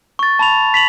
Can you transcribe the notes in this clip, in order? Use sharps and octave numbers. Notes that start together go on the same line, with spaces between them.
C#6 A6
A5 B5 F7
B6 F7 F#7